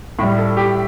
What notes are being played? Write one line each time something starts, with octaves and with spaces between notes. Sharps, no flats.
A2 G3
A4
G4